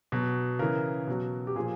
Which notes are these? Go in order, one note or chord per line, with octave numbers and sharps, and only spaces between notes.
B2 F#3
C#3 E3 A#4
B2 F#3
G4
A#2 F3 G#4